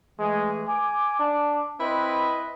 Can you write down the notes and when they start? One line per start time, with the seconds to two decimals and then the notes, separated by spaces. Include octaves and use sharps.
0.19 E3 G#3 A3 G#4
0.67 G#5 D6
1.19 D4
1.80 C4 E4 B4 D#5